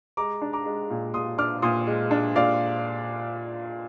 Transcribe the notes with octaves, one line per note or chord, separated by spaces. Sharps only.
G#3 A#5 D6
D4
A#5 D6
G#3
A#2
A#2 C6 D#6
D4 D6 F6
A#2 C6 D#6
G#3
D4
A#2 D5 F5